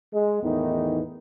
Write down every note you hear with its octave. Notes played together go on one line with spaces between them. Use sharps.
G#3
E2 A2 D#3 E3 B3 D#4